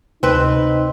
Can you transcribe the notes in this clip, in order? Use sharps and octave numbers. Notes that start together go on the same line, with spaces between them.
D2 C3 C4 D#4 B4